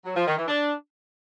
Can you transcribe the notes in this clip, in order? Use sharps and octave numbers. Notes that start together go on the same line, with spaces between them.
F#3
F3
D#3
E3
D4